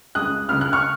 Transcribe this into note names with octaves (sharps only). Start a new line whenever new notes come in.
C#2 C#3 G#3 D#6 F#6
C#2 C#3 G#3 F6
F#6
C#6 F6